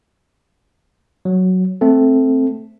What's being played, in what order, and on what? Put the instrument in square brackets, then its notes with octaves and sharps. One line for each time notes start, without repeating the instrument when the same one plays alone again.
[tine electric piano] F#3
A3 C4 A4